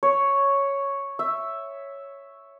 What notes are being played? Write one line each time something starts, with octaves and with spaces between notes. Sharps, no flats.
C#5
E5